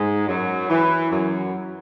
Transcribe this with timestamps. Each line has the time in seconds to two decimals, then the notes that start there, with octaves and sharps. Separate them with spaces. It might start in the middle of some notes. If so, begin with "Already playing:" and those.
Already playing: G#2 G#3
0.28 F#2 F#3
0.70 E3
1.11 F#2 F#3